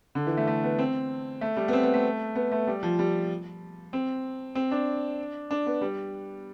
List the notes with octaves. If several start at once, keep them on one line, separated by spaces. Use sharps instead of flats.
D3
E3
A3
A3
B3
C4
A3
G3
B3
C4
B3
A3
B3
A3
G3
F3
G3
C4
C4
D4
D4
B3
G3